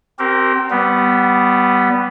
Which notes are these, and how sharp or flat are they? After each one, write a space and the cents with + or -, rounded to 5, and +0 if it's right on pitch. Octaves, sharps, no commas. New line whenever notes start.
C4 +10 G4 -40 A#4 +0
G3 -20 B3 +0